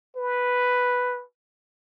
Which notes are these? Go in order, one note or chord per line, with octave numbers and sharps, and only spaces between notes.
B4